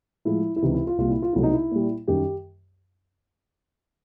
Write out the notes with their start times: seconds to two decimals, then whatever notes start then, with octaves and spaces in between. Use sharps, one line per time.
0.25 A2 F3 G#3 E4
0.56 E4
0.62 C#2 C3 E3 D#4
0.74 E4
0.87 F4
0.98 C2 A#2 G3 F4
1.10 E4
1.22 F4
1.33 C2 B2 F#3 A3 E4
1.43 D#4
1.53 E4
1.72 A#2 G3
2.08 F#2 D#3 G3 G4